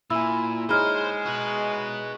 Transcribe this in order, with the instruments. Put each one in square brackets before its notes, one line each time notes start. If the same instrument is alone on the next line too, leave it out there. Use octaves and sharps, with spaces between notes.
[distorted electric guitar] A#2 [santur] E4 G#5 [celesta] E6
[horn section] G#3 [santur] D#4 G#4 C#5 [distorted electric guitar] C5 [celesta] B5 F6
[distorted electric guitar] F#4 B4